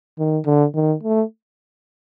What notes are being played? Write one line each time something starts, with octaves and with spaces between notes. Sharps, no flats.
D#3
D3
D#3
A3